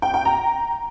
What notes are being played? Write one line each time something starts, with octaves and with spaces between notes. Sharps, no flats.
G5
G5
A#5